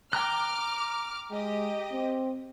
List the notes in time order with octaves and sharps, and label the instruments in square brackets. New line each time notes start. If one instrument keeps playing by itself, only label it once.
[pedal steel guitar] G5 A#5 F#6 [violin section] D6 F6
[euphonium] G#3 [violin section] G4 D#5
[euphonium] C4